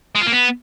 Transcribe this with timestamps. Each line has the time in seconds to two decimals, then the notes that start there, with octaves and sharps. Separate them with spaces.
0.15 G#3
0.21 F4
0.27 A#3
0.32 B3